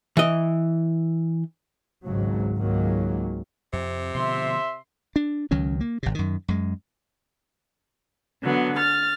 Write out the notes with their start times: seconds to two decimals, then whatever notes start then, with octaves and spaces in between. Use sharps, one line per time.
0.17 E3 D#5
2.04 G#1 C#2 G#2 C#3 F#3
2.56 C#2 G#2 D#3 F#3 A#3
3.73 F2 C3
4.15 B2 D3 F3 E5 C6
5.16 D4
5.51 C#2 D#3 F#3 C#4
5.80 A#3
6.03 G#1 C3
6.15 F#2 D#3
6.48 F#2 G#3
8.43 D3 F#3 B3
8.78 F6 A6